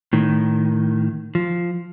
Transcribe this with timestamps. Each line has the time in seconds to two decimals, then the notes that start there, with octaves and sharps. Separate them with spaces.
0.13 A2 D#3
1.35 F3